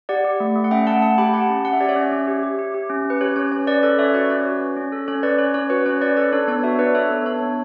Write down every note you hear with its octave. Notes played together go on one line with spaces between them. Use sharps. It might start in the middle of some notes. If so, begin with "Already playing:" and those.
G4 D5 F#5
G4
A3
A3
F#5
C#4 E5 G5
A3 F#5 A5
A3 F#5 A5
G4 G5 B5
G4 F#5 A5
C#4
C#4 F#5
E5
G4 D5
C#5 E5
C#4
C#4
G4
G4
G4
G4
C#4
C#4
B4
G4 C#5
C#4 C#5
C#4 C#5
C#4 B4 D5
A4 B4 D5
C#4 C#5 E5
F#4 B4 D5
D5
C#4 C#5
F#4
C#4
C#4
A4
C#4 C#5
C#4 B4 D5
C#4 C#5
C#4 C#5
F#4 B4
C#4 C#5
C#4 B4 D5
A4 B4 D5
D4 C#5
B3 C#5
F#4 C#5 E5
D4 B4 D5
A4 C#5 E5
B3
D4 C#5
B3